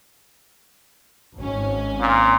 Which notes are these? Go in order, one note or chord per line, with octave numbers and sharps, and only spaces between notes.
G#1 C#4
A#2